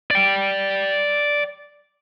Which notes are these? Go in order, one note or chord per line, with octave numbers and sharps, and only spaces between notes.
D5 G5